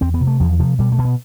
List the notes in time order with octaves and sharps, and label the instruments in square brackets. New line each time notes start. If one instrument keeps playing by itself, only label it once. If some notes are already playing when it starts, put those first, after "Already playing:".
[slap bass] E2 C4
B3
C3
A3
E2 F3
C3 F3
B2 G3
A3
B2
B3